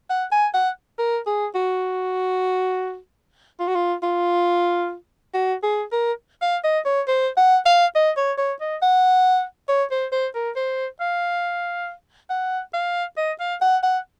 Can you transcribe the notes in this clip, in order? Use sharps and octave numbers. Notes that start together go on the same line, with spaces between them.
F#5
G#5
F#5
A#4
G#4
F#4
F4
F#4
F4
F4
F#4
G#4
A#4
F5
D#5
C#5
C5
F#5
F5
D#5
C#5
C#5
D#5
F#5
C#5
C5
C5
A#4
C5
F5
F#5
F5
D#5
F5
F#5
F#5